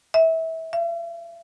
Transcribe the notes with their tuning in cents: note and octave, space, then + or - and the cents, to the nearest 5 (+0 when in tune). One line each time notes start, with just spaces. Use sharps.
E5 -25
E5 +45